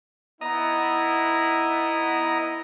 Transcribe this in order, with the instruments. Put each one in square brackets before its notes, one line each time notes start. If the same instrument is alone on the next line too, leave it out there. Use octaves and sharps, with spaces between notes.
[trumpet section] B3 E4 [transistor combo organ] D#5 A#5